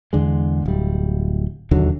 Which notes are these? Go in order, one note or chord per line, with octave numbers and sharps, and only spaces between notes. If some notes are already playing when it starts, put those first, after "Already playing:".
E2 D3 G#3
D1 G3
E1 D#2 D3 F#3